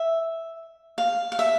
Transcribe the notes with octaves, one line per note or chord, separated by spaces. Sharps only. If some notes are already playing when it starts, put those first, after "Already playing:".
Already playing: E5
F5
F5
E5